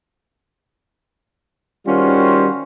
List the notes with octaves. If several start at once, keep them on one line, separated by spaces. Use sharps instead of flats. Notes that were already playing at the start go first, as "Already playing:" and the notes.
D#3 G3 C#4 F4 F#4 C5